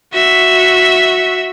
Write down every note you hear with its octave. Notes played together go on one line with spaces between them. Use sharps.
F#4 E5